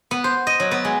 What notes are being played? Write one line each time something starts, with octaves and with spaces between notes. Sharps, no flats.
B3
C5
D#5
F#3
B3
G#3